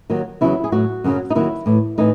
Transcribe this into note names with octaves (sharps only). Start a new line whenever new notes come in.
D#2 D#3 F#3
E2 C#3 F#3 E4
G#4
A2 F#3 F#4
F#2 C#3 F#3
D#4
D#2 D#3 F#3 E4
A2 E3
A2 E3 D#4